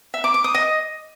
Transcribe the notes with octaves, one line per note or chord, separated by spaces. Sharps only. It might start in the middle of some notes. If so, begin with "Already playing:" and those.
E5
D6
D6
D#6
D#5